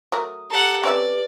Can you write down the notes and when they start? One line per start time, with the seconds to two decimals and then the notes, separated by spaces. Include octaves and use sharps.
0.12 F#3 A3 A#4 D#6
0.50 G4 A4 F#5 A#5
0.83 C4 C#4 B4 D5 E5